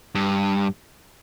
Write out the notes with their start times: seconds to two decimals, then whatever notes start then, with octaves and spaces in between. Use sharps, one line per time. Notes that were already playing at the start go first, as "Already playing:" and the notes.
0.15 G2